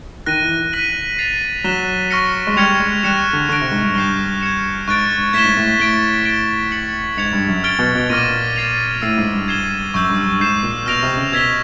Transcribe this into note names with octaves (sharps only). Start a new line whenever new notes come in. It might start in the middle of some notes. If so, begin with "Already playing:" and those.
D#3 F#6 A#6 D#7
E3
F#6 B6 D#7 F#7
A6 C7 F7
F#3 F#6 B6 E7 G7
C#6 F6 A#6 C#7
G#3
G3 F6 G#6 C#7 F7
G#3
G3 F#6 A#6 C#7 E7
D3
D3 C#6 F#6 A#6 D7
C3
G#2
G2
G2 G6 C7 E7 G7
G#6 C#7 E7
G#2 C#6 F#6 A6 D7
G#2
A2 G#6 B6 E7 G7
G#2
A2
A2 A6 D7 G7
A6 D7 G7
A6 C#7 F#7
G#2 G#6 C#7 F7
G2
F#2
F6 A6 D7 G7
B2
B2
A#2 D6 F6 A#6 D#7
A6 C7 F7
A2 E6 A6 C7 D#7
G#2
G2
G#6 C7 E7 G7
F#2 C#6 E6 G6
G2
G2
G#2 G6 C7 E7
A#2
B2 F6 A#6 D7 F7
C3
C#3
B2 E6 G#6 B6 E7 G7